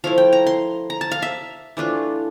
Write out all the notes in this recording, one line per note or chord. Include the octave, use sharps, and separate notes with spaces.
F3 A3 E4 F5
G5
A#5
C6
A#5
A5
F5
E5
E3 A3 D4 F4